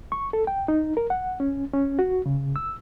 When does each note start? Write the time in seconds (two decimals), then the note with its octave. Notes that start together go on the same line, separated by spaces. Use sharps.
0.12 C#6
0.33 A4
0.47 G5
0.68 D#4
0.97 A#4
1.10 F#5
1.40 C#4
1.73 C#4
1.99 F#4
2.26 C#3
2.56 E6